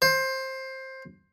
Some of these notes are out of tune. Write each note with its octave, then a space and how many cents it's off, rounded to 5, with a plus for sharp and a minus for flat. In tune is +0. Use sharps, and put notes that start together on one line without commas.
C5 +15